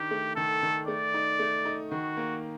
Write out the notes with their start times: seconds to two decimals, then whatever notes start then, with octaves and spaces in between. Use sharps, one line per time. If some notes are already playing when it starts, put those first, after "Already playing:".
Already playing: D#3 D4 G4
0.11 A3
0.36 D#3 A4
0.63 D#3
0.88 A3 D5
1.14 D#4
1.39 A3
1.65 D#4
1.91 D#3 F#4
2.17 A#3